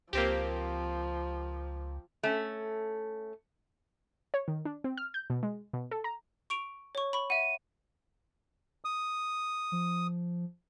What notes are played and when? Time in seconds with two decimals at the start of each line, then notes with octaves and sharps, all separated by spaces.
0.13 C#2 F3 A#3 C4 G4
2.23 A3 C#4
4.34 C#5
4.48 D#3
4.65 D4
4.84 C4
4.97 F6
5.14 G6
5.30 B2
5.43 G#3
5.73 B2
5.91 A4
6.04 A#5
6.50 C#6 D7 F7
6.95 C#5 C#6
7.13 B5 C#6
7.30 E5 F#5 D#7
8.85 D#6
9.72 F3